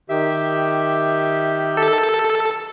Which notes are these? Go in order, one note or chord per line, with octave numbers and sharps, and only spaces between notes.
D#3 G4 E5
A4